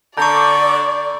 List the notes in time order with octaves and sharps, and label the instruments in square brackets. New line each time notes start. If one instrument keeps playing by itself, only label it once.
[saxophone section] D3 [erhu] D5 [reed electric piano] A5 G6 [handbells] A#5 C#6